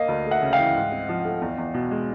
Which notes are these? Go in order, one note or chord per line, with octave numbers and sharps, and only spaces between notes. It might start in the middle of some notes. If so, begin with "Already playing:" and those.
Already playing: A#3 D#5 F5
D2
A3
E5 F#5
C#3
F5 G5
E3
G#2
C4
F3
A3
E2
E2
B2
G#3